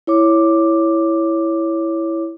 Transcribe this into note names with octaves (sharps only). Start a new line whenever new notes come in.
E4 C#5 D6